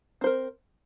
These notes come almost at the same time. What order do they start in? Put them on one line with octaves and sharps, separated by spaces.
C4 C5 A#4